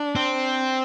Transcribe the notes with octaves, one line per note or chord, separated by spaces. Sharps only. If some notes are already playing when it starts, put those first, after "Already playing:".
Already playing: D4
C4